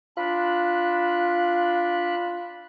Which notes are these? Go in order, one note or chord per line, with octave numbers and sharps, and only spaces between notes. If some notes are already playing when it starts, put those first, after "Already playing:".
D4 F4 B5 F#6